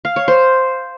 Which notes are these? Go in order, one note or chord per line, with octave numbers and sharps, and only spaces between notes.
F5
C#5
C5